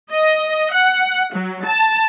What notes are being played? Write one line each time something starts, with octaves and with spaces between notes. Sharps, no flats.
D#5
F#5
F#3
A5